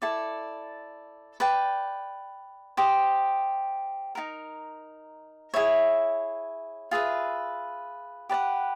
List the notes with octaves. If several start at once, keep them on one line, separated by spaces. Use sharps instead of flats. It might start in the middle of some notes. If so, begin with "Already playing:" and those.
E4 A4 D5
B4 D5 G5
G4 C5 D#5
D#4 F#4 A#4
E4 G#4 C#5 E5
F4 G#4 B4 E5
G4 B4 D5 F#5